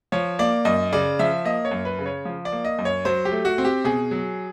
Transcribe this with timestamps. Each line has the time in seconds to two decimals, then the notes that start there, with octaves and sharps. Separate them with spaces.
0.12 F3 C#5
0.39 A#3 D5
0.65 F#2 D#5
0.93 C#3 D5
1.19 F3 E5
1.45 A#3 D#5
1.65 C#5
1.71 F#2
1.85 B4
1.99 C#3
2.06 C#5
2.25 F3
2.45 D5
2.52 A#3
2.65 D#5
2.79 F#2
2.85 C#5
3.05 F#3 C5
3.25 G4
3.32 A3
3.45 F#4
3.58 C4
3.65 G4
3.84 B2 G#4
4.11 F#3